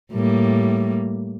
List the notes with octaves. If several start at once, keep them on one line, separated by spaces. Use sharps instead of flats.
A2 G3 A#3